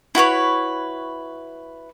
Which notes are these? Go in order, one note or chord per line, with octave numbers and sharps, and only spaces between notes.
E4 F#4 B4 C#5